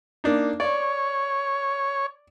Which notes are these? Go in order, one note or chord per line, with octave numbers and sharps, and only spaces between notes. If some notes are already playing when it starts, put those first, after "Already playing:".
A#3 D4 D#4
C#5 D5